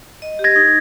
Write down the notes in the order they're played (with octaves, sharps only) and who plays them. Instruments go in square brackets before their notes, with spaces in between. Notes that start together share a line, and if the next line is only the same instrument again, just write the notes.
[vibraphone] D#5
G4
[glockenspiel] G#6 A#6
[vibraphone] D#4